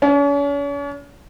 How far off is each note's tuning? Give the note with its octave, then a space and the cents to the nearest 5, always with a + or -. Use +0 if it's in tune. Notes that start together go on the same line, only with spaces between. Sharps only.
C#4 +40